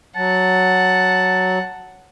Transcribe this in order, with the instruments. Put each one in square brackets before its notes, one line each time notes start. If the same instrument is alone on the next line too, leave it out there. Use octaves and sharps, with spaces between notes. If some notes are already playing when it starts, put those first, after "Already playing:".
[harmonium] F#3 [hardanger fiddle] F#5 [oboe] A5